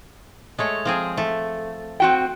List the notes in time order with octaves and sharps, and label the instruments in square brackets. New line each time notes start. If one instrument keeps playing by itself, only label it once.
[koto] G#3 A3 C#5
F3 C4 G#4
A3
[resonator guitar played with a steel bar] C4 F#4 G5